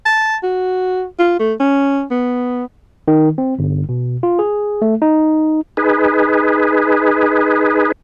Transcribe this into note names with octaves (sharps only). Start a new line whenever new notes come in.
A5
F#4
F4
A3
C#4
B3
D#3
C4
G1
B2
F4
G#4
A3
D#4
D#4 G#4 B4